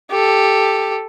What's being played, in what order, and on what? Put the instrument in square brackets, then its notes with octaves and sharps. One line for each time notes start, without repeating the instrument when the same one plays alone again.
[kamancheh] G4 A4